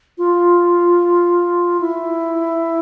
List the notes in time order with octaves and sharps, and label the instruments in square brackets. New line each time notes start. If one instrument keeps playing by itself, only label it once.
[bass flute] F4
E4